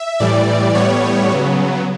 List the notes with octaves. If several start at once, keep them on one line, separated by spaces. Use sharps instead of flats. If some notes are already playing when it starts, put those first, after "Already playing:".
Already playing: E5
A2 E3 G3 D5
A2 G3 B3 C#5
C#3 F#3 B3